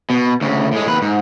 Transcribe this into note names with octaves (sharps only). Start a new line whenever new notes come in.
B2
D2 C#3
A2 G#3
D#2 B4
G#2